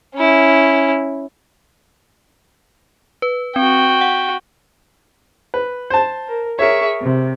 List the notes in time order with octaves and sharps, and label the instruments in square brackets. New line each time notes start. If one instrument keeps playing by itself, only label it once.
[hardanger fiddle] C#4 E4
[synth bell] B4
[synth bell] C4 [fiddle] F#4 G5
[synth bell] F#5
[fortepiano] B4
C5 A5
[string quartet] A#4
[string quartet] G#4 E5 C#6 [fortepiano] A#4 C#5
[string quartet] C3